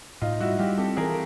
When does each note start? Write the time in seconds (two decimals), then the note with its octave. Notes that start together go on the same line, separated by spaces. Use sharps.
0.22 A2 D#4 F4
0.40 G3 E4 F#4
0.59 G3 F4 G4
0.78 C4 G4 A4
0.97 E3 G#4 A#4